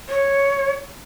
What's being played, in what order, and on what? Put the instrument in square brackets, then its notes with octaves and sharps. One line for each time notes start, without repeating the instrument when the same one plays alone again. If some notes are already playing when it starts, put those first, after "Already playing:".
[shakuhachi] C#5